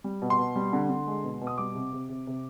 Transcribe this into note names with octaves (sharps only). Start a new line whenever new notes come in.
G3
B2
C6
B2
G3
D3
D3
G#3
B2
B2
D#6
G3 D6
C3
C3
C3
C3